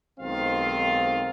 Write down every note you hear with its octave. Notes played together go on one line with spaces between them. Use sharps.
B1 D#3 G#3 C4 F4 F5